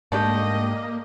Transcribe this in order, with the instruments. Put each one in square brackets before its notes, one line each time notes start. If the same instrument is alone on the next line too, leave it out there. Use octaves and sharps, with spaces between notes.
[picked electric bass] G#2 [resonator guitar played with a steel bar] A3 D4 G4 [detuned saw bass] A#3 [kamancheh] D#5